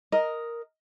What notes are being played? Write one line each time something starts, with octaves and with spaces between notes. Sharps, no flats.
A#4 D#5